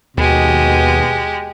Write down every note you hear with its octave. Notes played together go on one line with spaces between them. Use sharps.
D#2 B2 G#3 G4